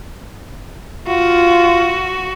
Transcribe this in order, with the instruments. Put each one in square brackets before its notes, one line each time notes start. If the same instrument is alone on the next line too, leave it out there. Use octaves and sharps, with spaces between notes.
[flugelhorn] F4 [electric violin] F#4